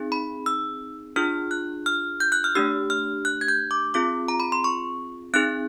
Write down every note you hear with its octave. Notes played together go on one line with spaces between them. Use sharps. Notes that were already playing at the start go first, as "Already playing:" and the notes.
Already playing: C4 D#4 G#4
B5
E6
D4 F4 G#4 F6
F#6
F6
G6
F#6
F6
A3 D4 G4 E6
F6
F#6
G#6
G6
D6
C4 F4 G#4 D6
A#5
B5
C6
C#6
C4 D#4 G#4 F#6